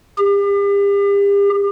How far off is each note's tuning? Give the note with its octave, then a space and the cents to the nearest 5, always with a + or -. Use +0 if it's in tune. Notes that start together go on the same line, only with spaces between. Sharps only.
G4 +40